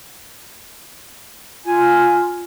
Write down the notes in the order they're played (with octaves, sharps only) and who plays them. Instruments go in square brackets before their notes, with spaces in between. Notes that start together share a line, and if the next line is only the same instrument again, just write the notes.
[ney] F4 [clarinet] G#5